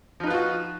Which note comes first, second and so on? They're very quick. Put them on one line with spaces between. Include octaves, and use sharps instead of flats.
F3 D#4 B4 F4 F#4